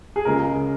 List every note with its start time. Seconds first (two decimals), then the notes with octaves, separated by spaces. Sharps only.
0.16 G#4
0.25 C#2 C#3 G#3 A#4